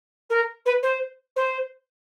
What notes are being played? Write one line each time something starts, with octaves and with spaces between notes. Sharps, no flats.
A#4
B4
C5
C5